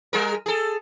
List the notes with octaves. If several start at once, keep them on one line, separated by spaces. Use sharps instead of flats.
G3 G#4 A#4
G#4 A4